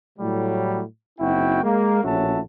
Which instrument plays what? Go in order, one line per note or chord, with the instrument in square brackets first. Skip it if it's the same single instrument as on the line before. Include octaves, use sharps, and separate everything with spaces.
[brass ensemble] A2 F#3 G3
F#1 C4 D#4 E4 F#4 G5
G#3 A#3
A#1 A2 C#4 F#4 E5 A5